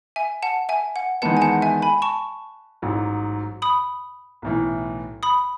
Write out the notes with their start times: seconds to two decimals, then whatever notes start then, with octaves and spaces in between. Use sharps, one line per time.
0.16 E5 G#5
0.43 F#5 A5
0.69 E5 G#5
0.96 F#5
1.22 E2 D#3 G#3 B3 F#5 A5
1.37 G#5
1.42 F#5 A5
1.62 E5 G#5
1.82 G#5 B5
2.02 A5 C#6
2.82 A1 G#2 F#3
3.62 B5 D#6
4.42 B1 A2 E3
5.23 B5 D#6